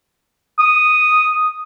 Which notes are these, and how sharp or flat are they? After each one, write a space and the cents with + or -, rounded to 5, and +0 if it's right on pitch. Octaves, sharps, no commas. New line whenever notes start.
D#6 -5